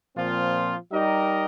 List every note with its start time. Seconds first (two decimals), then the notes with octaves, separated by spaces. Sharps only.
0.16 A#2 F3 C4 F4
0.92 G3 D#4 G4 A#4 D#5